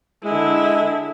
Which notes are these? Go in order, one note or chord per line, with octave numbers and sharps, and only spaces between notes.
D3 G#3 E4